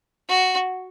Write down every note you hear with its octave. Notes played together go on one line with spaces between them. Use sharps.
F#4